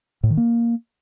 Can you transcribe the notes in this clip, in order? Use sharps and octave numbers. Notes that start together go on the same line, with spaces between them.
A2
D#3
A#3